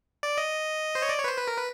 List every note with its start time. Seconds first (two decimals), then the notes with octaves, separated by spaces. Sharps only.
0.23 D5
0.38 D#5
0.95 C5
1.02 C#5
1.09 D5
1.18 C#5
1.24 B4
1.28 C5
1.38 B4
1.48 A#4
1.58 B4